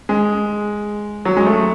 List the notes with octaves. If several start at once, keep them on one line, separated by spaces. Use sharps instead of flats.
G#3
F#3
G#3
A3